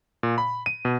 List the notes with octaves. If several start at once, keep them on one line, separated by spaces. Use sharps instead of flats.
A#2
B5
D#7
B2